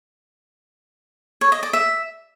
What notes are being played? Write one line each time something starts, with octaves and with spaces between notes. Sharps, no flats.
C#5
D#5
D5
E5